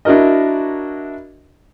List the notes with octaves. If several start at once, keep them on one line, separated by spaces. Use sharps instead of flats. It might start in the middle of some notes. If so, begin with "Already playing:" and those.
D4 E4 F#4 A#4 D#5